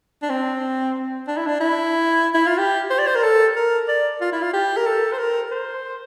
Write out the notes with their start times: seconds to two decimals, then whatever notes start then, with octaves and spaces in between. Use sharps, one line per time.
0.22 D4
0.30 C4
1.28 D4
1.37 E4
1.47 D4
1.60 E4
2.34 E4
2.46 F4
2.58 G4
2.90 C5
2.99 D5
3.07 C5
3.15 A#4
3.23 A4
3.56 A#4
3.88 D5
4.21 F4
4.32 E4
4.42 F4
4.53 G4
4.77 A#4
4.86 A4
5.12 C5
5.18 A#4
5.51 C5